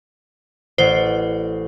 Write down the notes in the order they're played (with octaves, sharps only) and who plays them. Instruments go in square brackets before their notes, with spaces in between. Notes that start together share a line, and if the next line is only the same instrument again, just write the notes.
[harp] A1 D5 F#5 [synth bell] C5